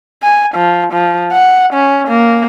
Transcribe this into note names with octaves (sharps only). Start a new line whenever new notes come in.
G#5
F3
F3
F#5
C#4
A#3